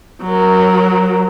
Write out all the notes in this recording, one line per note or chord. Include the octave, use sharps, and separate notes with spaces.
F#3 A#4